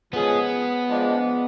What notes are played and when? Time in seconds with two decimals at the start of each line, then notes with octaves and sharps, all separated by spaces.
0.12 F3 G#3 B3 C#4 G#4
0.89 F3 G#3 D4